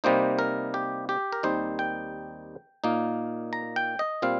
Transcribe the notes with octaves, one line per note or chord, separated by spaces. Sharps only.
C3 G3 A#3 D#4 C5
A#4
G4
G4
A#4
D#2 D#3 G3 C4 D#4 C5
G5
A#2 A#3 D#4
A#5
G5
D#5
A#2 G3 C4 F5